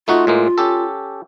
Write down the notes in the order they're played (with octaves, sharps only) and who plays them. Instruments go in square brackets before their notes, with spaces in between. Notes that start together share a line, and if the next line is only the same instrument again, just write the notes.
[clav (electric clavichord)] A3 D#4 F#4 [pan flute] F4
[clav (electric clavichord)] A2 G#3 A#3
C#4 G4 A4